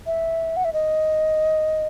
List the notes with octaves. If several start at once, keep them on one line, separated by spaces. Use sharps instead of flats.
E5
F#5
E5
D#5